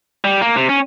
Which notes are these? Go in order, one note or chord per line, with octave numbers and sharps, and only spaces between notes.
G3
A#3
C3
C#4